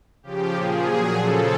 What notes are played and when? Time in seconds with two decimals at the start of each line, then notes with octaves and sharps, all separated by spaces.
0.23 C#3 F3 G4
0.54 A#2 F3 G#4
0.85 A#2 F#3 G#4
1.15 C#3 F3 A4